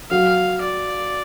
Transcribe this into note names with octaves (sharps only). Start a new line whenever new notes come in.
F#3 F5
D5